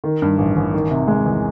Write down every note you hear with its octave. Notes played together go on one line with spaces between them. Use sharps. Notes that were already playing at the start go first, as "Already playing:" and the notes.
D#3
G2
A1
A1
D#3
C3
G#3
E2